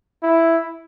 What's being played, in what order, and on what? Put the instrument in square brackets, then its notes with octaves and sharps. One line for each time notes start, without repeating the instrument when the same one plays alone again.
[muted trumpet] E4